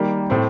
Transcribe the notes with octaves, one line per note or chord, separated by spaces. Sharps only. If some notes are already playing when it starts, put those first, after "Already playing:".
Already playing: D#3 G3 A#3
A2 A3 C4